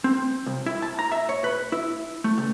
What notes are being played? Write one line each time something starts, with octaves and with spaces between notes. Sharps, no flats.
C4
C2
E4
A5
A#5
E5
C#5
B4
E4
A3
C#2